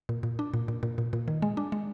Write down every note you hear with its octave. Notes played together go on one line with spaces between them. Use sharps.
A#2
A#2
D4
A#2
A#2
A#2
A#2
A#2
D#3
G#3
D4
G#3